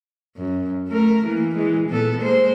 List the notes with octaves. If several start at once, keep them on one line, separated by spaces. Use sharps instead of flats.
F#2
A3 A#4
E3 A#3
E3 G#3
A#2 B3 A4
G#3 A#3 C5